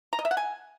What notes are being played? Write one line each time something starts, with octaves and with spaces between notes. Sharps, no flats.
A#5
D#5
E5
F#5
G#5